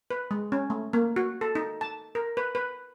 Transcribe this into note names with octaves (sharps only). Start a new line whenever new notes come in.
B4
G#3
C#4
A3
A#3
F#4
A4
D#4
A5
A#4
B4
B4